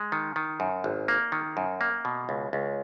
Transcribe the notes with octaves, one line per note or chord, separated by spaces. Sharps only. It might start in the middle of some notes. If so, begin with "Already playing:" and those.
Already playing: G#3
D#3
D#3
F#2
G#1
A#3
D#3
F#2
A#3
B2
C#2
C#2